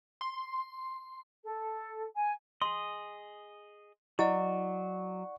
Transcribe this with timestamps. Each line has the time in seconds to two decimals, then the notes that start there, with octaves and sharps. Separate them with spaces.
0.21 C6
1.44 A4
2.14 G#5
2.62 G#4 D#5 C6
4.19 F#3 E4 D5 D#5 F#5 C#6